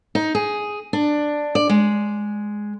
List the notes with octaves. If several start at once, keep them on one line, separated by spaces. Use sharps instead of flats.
D#4
G#4
D4
D5
G#3